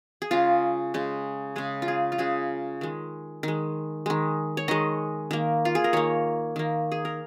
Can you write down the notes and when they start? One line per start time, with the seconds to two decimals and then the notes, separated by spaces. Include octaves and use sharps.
0.22 G#4
0.31 C#3 G#3 F4
0.94 C#3 G#3
1.56 C#3 G#3 G#4
1.82 F4
1.88 G#4
2.12 F4
2.18 C#3 G#3 G#4
2.81 D#3 G#3
3.43 D#3 G#3
4.06 D#3 G#3
4.57 C#5
4.68 D#3 G#3 D#5
5.31 D#3 A#3
5.65 F4
5.75 G#4
5.84 A#4
5.93 D#3 A#3 C#5
6.56 D#3 A#3
6.92 G#4
7.05 A#4